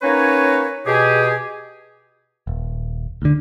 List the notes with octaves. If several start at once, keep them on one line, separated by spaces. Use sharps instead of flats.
A#3 C#4 D#4 F#4 B4 C#5
B2 G4 G#4
D#1
D2 D3